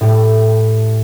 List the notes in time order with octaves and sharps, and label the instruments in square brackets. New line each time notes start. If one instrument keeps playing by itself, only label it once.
[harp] A2 G4